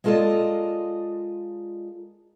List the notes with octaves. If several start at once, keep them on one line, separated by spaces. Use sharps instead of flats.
G#3 A#3 F4 A4 D5 D#5